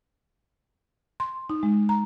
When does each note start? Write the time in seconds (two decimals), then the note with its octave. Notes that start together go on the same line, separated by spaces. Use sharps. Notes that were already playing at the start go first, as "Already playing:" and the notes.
1.20 C6
1.50 D#4
1.63 G#3
1.89 A#5